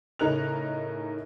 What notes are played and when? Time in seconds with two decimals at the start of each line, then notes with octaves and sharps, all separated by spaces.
0.19 A2 C#3 D#4 A#4 F#6 F7